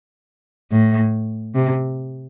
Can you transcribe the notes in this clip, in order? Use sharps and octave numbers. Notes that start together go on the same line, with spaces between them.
A2
C3